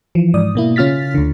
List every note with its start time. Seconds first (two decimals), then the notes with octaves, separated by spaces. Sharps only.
0.15 E3 F3
0.34 G#2 D5 D#6
0.55 B2 A#3 E4
0.76 C#3 C#4 F4 F6 A6 B6
1.15 D2 D3